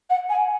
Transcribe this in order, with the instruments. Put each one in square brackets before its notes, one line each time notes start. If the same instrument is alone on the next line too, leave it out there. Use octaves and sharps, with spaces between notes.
[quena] F#5
G#5